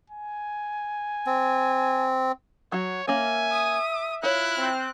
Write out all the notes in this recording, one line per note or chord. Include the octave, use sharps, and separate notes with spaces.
G#5
C4
F#3 F#4 C#5
A#3 C#4 E5 G#5
D#6
E4 F4 C#5 F#6
C4